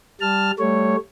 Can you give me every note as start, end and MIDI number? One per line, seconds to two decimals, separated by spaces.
0.21 0.51 55
0.21 0.51 81
0.21 0.51 89
0.59 0.96 55
0.59 0.96 57
0.59 0.96 73